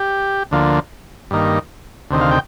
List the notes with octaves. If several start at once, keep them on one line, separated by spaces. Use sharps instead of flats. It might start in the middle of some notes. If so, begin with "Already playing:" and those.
Already playing: G4
D2 D3 F3 A#3
G2 D#3 A#3
D2 C3 D#3
F5
G5